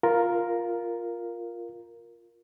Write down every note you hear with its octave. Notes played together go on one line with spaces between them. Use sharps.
F4 A#4